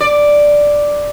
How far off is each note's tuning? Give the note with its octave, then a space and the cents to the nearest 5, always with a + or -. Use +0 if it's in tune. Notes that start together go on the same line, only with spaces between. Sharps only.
D5 +0